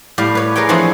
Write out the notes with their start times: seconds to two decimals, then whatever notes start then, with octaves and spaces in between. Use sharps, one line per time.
0.18 A2 G3 G4 F5
0.35 B4 C#5
0.56 G#4 A#4 B4 C#5 G5
0.69 E3 F3 B3 C4 D4 C#5